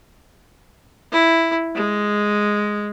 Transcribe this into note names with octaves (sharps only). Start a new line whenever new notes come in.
E4
G#3